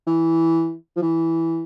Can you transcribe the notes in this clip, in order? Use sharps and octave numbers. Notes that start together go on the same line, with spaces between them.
E3
F3
E3